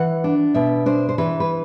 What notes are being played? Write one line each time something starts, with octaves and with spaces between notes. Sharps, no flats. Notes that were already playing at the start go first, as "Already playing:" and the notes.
Already playing: E3 F#5
D4
B2 E5
D4 C5
C5
E3 B4
B4